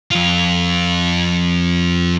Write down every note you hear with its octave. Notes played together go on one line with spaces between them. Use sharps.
F2 F4